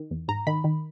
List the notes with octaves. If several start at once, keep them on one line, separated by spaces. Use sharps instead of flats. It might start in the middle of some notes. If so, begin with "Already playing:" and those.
Already playing: D#3
E2
G#2 A#5
D#3 B5
D#3